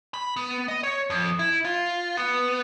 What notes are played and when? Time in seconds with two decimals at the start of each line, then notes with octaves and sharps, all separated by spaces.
0.14 B5
0.36 B3
0.68 D#5
0.83 C#5
1.10 F2
1.39 E4
1.65 F4
2.17 B3